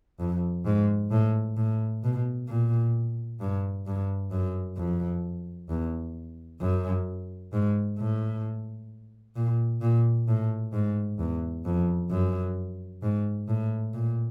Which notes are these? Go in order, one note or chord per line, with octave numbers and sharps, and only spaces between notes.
F2
G#2
A2
A2
B2
A#2
G2
G2
F#2
F2
E2
F#2
G#2
A2
A#2
A#2
A2
G#2
E2
F2
F#2
G#2
A2
A#2